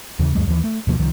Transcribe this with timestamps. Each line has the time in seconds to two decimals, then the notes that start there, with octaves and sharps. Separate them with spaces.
0.19 D#2 C#3 E3
0.35 D2 G2 F#3 G#3
0.47 D#2 E3
0.64 A3
0.87 D2 B2 F3 A#3
0.99 C2 D#3 F3